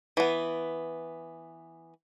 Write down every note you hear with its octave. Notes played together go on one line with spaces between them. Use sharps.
E3 B3